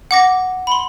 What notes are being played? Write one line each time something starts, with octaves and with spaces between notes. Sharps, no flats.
F#5 D6 A#6
B5 C6